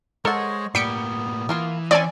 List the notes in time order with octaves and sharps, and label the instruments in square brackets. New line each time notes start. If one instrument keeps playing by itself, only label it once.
[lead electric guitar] G#3 [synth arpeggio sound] A4 [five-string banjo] A#4 F#5 [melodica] C5 C#5 D#5
[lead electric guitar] A2 A#3 [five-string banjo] G3 [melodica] B3 [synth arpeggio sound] B6 C#7 D7
[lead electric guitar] E3 [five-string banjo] A#3 F4 A#4
[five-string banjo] C4 C#4 C#5 [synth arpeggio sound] D5 G#5 [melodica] E5